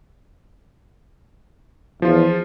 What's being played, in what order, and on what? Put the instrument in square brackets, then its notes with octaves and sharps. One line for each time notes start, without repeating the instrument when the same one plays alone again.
[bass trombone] E2 [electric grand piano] F3 F4